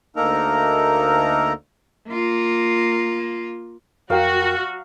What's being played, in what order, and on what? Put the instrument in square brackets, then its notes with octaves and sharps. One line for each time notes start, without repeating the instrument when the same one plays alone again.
[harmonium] D2 A#3 D#4 A4 A#4 A#5
[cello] A#3 F4
[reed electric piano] F2 A#4 G5 [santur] F#3 F5 [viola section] F#4